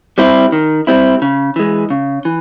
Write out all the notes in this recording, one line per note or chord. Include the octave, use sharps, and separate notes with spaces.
G3 C4 E4
D#3
G3 C4 E4
C#3
E3 G#3
C#3
E3